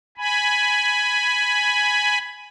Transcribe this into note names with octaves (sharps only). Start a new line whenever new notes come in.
G#5 B5